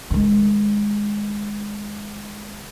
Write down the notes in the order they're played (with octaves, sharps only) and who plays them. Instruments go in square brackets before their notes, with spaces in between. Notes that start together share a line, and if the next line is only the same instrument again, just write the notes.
[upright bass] D#3 G#3